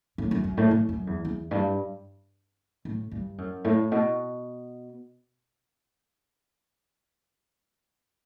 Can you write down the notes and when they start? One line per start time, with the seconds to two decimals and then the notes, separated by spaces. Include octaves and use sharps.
0.18 A2
0.31 F#2
0.44 F#2
0.57 A2
0.71 A2
0.89 F#2
1.07 E2
1.25 E2
1.51 G2
2.85 A2
3.11 G2
3.38 F#2
3.64 A2
3.92 B2